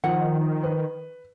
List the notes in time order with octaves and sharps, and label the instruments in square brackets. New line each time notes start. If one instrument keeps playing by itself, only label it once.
[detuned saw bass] D#3 [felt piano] F3 [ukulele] F#5
[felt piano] B4